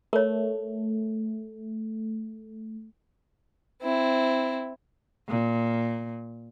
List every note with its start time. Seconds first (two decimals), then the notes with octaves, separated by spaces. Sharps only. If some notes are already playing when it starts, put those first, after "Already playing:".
0.13 A3 A#4 C#5
3.82 C4 E4
5.29 A#2